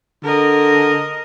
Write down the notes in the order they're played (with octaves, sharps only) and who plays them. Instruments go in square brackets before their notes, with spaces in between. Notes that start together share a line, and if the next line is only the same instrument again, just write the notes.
[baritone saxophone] D3 [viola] A#4 D#5